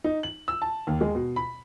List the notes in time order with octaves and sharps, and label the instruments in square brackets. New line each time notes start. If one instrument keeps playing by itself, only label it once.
[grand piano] D#4
F#7
E6
A5
D#2
G#3
B2
B5